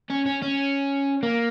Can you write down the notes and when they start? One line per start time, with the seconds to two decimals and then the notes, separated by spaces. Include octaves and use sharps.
0.10 C#4
0.26 C#4
0.42 C#4
1.23 A#3